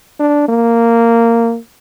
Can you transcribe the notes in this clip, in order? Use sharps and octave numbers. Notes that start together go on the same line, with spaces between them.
D4
A#3